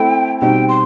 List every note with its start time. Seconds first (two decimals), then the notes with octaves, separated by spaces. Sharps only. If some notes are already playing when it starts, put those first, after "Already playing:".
Already playing: A3 C4 E4 A4 G5
0.41 B2 G3 C4 D#4 G5
0.68 C6